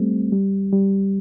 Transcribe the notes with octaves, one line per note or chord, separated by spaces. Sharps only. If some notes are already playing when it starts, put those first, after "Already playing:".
Already playing: G3 A3 C4
G3
G3